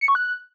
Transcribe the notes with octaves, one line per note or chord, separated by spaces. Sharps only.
C#7
C#6
F#6